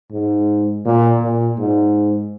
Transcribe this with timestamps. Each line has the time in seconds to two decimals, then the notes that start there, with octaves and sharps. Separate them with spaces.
0.12 G#2
0.86 A#2
1.22 A#2
1.59 G#2